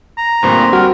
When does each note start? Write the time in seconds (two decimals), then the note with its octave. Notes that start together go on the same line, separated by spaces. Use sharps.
0.18 A#5
0.43 D2 G2 A#2 C4
0.73 G3 F#4 A#4